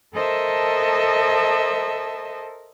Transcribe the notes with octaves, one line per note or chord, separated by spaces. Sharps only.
A4 A#4 C5 D#5 E5 A5